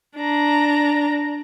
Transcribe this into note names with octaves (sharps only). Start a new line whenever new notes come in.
D4 A#5